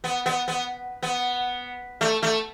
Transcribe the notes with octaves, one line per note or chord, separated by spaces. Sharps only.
B3
B3
B3
B3
A3
A3